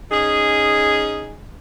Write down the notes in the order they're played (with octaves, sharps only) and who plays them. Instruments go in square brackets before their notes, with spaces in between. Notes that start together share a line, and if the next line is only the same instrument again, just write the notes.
[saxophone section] C#4 D#4 G#4